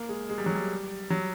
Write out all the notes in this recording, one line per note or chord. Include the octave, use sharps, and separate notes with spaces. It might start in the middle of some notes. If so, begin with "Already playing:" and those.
Already playing: A#3
G#3
G#3
G3
F#3
G3
F#3